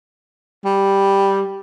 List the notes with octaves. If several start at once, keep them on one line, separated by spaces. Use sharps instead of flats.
G3